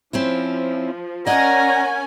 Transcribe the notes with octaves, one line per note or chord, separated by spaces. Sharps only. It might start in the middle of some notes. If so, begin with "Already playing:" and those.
F3 C4 C#4 E4
C#4 A#4 D5 D#5 F#5 G#5 A#5